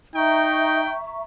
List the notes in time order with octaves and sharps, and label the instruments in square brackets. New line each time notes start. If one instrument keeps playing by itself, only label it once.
[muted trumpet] D#4 [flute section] E5 A#5 C#6 [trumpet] G5